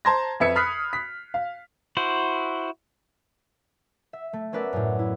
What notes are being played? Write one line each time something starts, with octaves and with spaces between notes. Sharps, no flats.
C5 A5 A#5 C6 G#6 A#6
F2 B4 E5 G#6 C#7
B5 D#6 F6 F#6 B6 C7
B6
F5
E4 F#4 C5
E5
A3
B3 C#4 A#4 B4 D5 E5
F#2 A2
E4